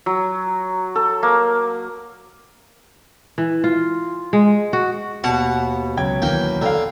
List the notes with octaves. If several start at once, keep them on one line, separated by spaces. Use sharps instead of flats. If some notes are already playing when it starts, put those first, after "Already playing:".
F#3
A4
A#3
E3
F4
G#3
F#4
D#2 B2 F#5
C#2 F#3 G5 G#6
D#2 E3 A#3 G5
D3 F5 G5 A#5